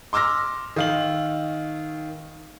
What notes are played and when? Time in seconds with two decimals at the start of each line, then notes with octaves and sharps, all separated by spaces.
0.13 C6 D6 E6 F6 A#6
0.76 D#3 F5 F#7